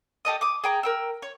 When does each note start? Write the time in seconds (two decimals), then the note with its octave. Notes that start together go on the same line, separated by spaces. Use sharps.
0.25 G4 A4 D#5 D#6
0.41 D6 D#6
0.64 G#4 G5 A#5
0.83 A#4 G5 E6
1.22 C#5